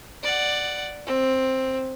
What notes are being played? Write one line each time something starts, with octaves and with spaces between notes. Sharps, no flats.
D5 F#5
C4